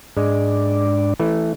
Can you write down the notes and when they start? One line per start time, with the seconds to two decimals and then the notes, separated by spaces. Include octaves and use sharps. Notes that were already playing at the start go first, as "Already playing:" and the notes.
0.17 G#2 G#3 D4 D5
1.20 E3 A3